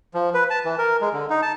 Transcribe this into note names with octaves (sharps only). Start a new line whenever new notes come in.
F3
B4
A5
E3
A#4
G#3
D3
D#4
A5